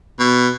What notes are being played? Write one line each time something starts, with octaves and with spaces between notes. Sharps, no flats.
B2